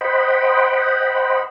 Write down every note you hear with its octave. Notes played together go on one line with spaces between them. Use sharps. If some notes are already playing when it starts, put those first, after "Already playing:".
C5 D#5 F#5 G5 B5